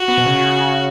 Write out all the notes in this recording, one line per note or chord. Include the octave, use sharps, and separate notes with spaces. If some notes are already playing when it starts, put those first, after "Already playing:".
Already playing: F#4
B3
B2
C#3